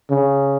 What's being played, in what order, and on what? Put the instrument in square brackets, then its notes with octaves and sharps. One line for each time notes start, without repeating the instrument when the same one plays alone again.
[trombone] C#3